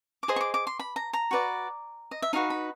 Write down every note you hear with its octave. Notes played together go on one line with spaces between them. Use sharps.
D6
G#4 C5 D#5 D#6
C#6
D6
D6
C6
B5
A#5
A#5
F#4 B4 D5
D#5
E5
D#4 F#4 B4 F5
B5